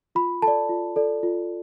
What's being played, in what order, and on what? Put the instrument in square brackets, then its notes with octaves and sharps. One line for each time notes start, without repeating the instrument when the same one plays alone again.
[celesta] F4 B5
A4 A5
D5
F4
A4 D5
F4